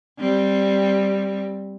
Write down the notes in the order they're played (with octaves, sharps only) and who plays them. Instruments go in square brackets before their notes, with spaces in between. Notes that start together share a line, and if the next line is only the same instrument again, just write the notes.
[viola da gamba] G3 C4